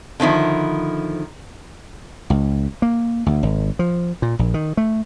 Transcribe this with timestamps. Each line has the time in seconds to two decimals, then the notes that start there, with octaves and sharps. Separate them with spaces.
0.20 D3 D#3 F3 E4
2.30 C#2
2.82 A#3
3.26 D2
3.43 G#1
3.79 F3
4.22 A#2
4.39 A#1
4.54 D#3
4.77 A3